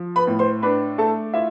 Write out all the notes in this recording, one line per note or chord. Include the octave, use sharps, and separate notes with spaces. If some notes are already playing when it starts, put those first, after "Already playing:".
Already playing: F3
B4 B5
A2
C5 C6
D4 B4 B5
A3 A4 A5
E4 F4 E5